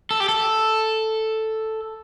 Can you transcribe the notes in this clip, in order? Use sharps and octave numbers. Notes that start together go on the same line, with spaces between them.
A4
G4
A4